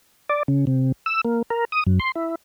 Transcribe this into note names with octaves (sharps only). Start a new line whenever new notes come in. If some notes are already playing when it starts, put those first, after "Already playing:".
D5
C#3
C3
E6
A#3
A#4
D#6
F#2
C6
E4